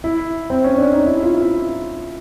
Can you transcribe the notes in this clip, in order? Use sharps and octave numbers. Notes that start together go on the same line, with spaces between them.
E4
C4
C#4
D4
D#4
E4
E4
F4
E4